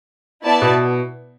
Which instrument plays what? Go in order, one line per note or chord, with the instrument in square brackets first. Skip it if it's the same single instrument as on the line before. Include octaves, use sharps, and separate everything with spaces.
[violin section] B3 E4 D5 A5
[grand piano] B2